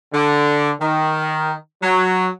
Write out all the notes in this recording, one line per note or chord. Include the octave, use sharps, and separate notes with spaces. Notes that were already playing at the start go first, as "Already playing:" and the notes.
D3
D#3
F#3